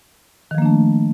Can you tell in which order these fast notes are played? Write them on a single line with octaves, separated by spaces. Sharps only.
D#3 F3 A#3 D4 A3